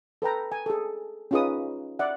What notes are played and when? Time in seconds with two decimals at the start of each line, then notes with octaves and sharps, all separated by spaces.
0.22 A4 B4 G5 A#5
0.52 G#5
0.66 G#4 A4
1.31 C#4 D#4 F4 G#4 B4 D#6
1.99 D5 E5 F#5